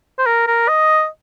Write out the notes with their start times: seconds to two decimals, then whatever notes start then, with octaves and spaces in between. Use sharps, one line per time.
0.18 C5
0.26 A#4
0.47 A#4
0.68 D#5